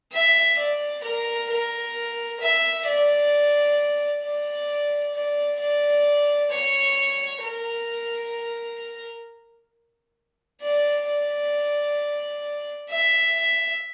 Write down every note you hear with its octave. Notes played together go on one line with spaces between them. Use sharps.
E5
D5
A#4
A#4
E5
D5
D5
D5
D5
C#5
A#4
D5
D5
E5